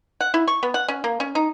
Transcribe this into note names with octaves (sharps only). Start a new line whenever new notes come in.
F#5
E4
C#6
B3
F#5
C#4
A#3
C#4
D#4